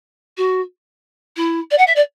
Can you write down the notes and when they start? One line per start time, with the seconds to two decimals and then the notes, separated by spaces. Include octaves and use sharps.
0.37 F#4
1.37 E4
1.71 D5
1.78 F#5
1.87 E5
1.96 D5